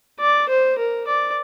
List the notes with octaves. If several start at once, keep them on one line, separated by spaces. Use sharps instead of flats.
D5
C5
A#4
D5